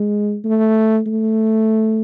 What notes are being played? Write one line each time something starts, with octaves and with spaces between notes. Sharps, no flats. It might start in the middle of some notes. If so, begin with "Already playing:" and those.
Already playing: G#3
A3
A3